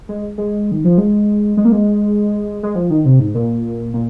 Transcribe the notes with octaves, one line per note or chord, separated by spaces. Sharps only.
G#3
G#3
D#3
F3
G#3
G#3
A#3
G#3
G#3
F3
D#3
C3
G#2
A#2
A#2